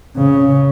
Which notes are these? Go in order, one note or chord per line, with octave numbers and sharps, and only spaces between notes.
C#3